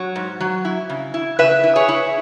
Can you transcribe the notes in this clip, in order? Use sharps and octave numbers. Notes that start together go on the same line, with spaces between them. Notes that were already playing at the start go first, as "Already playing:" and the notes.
Already playing: F#3
G#2
F#3
E4
C#3
E4
C#3 B4 E5
E4
G#4 C#5
E4